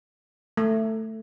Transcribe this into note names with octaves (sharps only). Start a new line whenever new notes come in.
A3